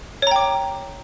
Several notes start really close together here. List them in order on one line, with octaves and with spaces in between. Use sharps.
C#5 A#5 G5 D6